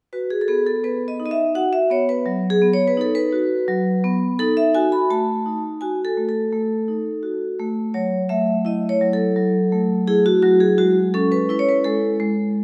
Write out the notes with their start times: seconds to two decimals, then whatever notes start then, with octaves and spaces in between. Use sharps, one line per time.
0.13 F#4 B4
0.30 G#4
0.41 A4
0.48 B3 G#4
0.66 A4
0.84 B3 B4
1.08 D#5
1.20 D#4
1.26 D#5
1.31 E5
1.55 F#4 F#5
1.73 E5
1.90 B3 C#5
2.09 B4
2.26 F#3
2.50 G#4
2.62 B3
2.73 C#5
2.88 B4
2.97 D#4 A4
3.15 B4
3.33 F#4
3.68 F#3
4.04 B3
4.39 D#4 A4
4.57 E5
4.75 F#4 G#5
4.92 B5
5.10 A3 A5
5.46 D#4
5.81 F#4 G#5
6.05 A4
6.17 A3
6.29 A4
6.53 A3
6.88 D#4
7.23 F#4
7.59 A3
7.94 F#3 C#5
8.29 A3 E5
8.65 E4 D#5
8.89 C#5
9.01 F#3
9.13 A4
9.36 F#3
9.72 A3
10.08 E4 G#4
10.26 F#4
10.42 F#3 F#4
10.60 G#4
10.78 G#3 F#4
11.14 C#4 A4
11.32 B4
11.49 E4 B4
11.59 C#5
11.69 B4
11.84 G#3 A4
12.20 G#3